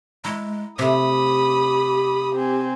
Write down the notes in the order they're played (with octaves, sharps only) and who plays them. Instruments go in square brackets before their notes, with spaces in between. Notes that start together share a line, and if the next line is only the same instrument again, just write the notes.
[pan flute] G#3 [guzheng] E4 A#5
[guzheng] C3 A3 [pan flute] G4 [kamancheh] B5 D#6
[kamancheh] C4 G#5